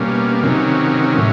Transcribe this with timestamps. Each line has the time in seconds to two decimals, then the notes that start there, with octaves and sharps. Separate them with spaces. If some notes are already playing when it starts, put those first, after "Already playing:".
Already playing: B2 G3 A#3 C#4
0.43 C3 D#3 F#3 C#4
1.17 A2 F#3